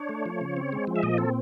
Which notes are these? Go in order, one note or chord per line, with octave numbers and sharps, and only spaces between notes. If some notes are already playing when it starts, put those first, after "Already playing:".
Already playing: D4 C#5
A3
F3
C#3
C4
G#3
F3
E5
A#2 D#5
C4 A4